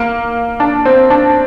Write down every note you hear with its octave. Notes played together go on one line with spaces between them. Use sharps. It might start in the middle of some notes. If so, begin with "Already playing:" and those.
Already playing: A#3
D4
C4
D4